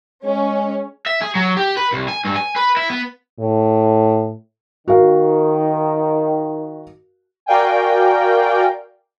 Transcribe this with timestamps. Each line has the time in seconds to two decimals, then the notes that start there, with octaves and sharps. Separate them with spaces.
0.24 G#3 C#4
1.07 E5
1.22 G#4
1.35 F#3
1.57 G4
1.77 B4
1.93 C2
2.08 G#5
2.25 G2
2.36 G#5
2.56 B4
2.77 E4
2.90 B3
3.40 A2
4.88 D#3 F#4 A#4 F5
7.46 F#4 A#4 D5 F5 G5 G#5